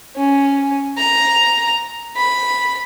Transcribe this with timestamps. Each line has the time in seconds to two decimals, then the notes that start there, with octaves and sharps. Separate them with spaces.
0.16 C#4
0.98 A#5
2.16 B5